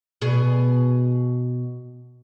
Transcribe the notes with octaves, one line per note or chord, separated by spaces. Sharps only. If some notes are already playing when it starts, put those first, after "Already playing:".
B2 G#4